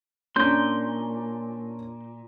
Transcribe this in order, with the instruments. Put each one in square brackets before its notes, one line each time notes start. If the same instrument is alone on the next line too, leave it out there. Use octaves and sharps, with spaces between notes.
[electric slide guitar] A#2 [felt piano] C#4 D4 [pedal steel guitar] C6 G6